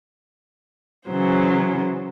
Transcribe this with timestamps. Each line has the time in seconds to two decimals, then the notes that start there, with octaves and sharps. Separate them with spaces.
1.08 C#3 E3 F#3 C5